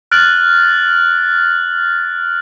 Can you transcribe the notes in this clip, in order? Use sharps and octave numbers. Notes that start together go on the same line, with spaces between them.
F6 F#6 A6 D7 F#7